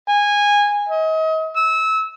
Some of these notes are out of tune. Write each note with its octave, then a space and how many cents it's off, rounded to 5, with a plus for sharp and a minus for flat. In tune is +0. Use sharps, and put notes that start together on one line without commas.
G#5 -15
D#5 +35
E6 -25